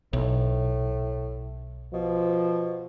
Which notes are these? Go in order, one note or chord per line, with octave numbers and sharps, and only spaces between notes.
B1 A2
B2 F3